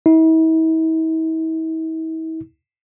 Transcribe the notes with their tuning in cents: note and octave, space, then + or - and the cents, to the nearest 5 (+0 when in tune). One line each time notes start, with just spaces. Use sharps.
E4 -45